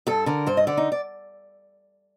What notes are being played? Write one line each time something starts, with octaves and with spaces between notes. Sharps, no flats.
G2 A4
D3 A#4
G2 C5
D#5
D3 D5
D#4
D5